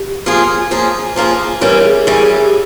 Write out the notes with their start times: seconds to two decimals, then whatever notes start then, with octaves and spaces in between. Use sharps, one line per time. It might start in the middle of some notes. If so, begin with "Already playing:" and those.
Already playing: G4
0.26 F3 A#3 F4 G#4
0.71 F3 A#3 F4 G#4
1.16 F3 A#3 F4 G#4
1.61 E3 G3 C#4 A#4
1.85 G#4
2.07 E3 G3 C#4 G4
2.20 G#4
2.33 G4